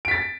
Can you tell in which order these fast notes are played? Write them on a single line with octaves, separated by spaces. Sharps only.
D7 B6 A6